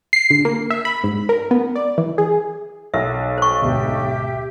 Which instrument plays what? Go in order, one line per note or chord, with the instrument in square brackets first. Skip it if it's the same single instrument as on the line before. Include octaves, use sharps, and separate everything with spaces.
[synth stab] C7
D3
A#3
E5
B5
G#2
A#4
B3
D5
E3
G#4
[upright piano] B1 [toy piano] E5
[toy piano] C5 C#6
[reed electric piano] D2 G#2 B2 [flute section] G4 E5